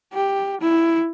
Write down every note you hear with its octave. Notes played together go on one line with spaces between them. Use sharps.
G4
E4